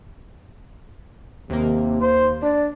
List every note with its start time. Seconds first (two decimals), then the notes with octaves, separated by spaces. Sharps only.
1.50 D#2 C3 A#3
2.01 C5 C6
2.42 D4 D5